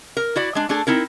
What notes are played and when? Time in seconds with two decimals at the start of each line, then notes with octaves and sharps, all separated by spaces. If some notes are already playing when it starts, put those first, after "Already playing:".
0.17 A#4
0.36 E4 F#4 D5
0.55 G#3 D4
0.69 A3 D4 G#4 A4
0.87 C4 D#4 E4 A#4